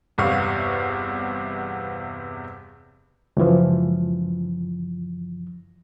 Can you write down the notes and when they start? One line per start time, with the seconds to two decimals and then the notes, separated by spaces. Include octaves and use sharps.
0.18 G1 E2 C3 B3 F5 C#6
3.37 C#2 F#2 E3 F3